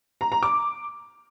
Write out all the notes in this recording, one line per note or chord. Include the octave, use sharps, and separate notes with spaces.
A#5
A#5
D6